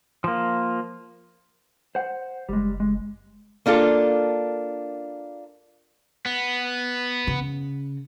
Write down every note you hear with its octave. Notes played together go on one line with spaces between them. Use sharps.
F3 A#3
C5 F#5
F#1 G3 G#3
G#3
A#3 D4 F4 A4
B3
C#3